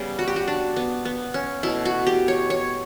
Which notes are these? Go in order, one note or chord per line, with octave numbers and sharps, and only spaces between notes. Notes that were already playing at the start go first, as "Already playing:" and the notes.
Already playing: C#3 G3 B3
F#4
G4
F#4
D4
B3
B3
C#4
B2 A3 E4
F#4
G4
C#5
C#5